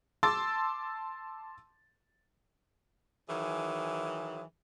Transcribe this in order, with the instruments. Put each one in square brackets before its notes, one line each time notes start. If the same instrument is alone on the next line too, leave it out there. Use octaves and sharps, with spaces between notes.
[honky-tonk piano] A5 C6 D6 E6 A6
[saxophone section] D#3 E3 F#3 G#4